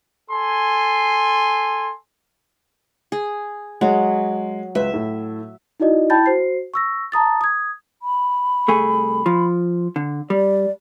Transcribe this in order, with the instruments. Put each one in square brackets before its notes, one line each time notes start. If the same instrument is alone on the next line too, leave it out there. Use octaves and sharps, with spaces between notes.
[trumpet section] A4 G#5 C6
[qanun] G#4
[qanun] F#3 [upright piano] G#3
[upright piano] C#2 B4 [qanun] E5
[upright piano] A2
[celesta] D#4 E4 F#4 D5 D#5
E4 G5 A5 B5 G6 A6
F#4 C5 C7
C#6 E6 A#6
A5 A#5 D#6 A6
D#6 G#6
[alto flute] B5
[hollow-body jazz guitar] C2 A3 G#4
F3
D3
[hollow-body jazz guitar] G3 [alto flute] D5